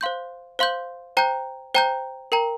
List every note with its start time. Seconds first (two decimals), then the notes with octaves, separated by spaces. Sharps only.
0.01 C5 F5 C6 G6
0.59 C5 F5 C6 G6
1.17 C5 G5 A#5 G6
1.75 C5 G5 A#5 G6
2.32 A#4 G5 A#5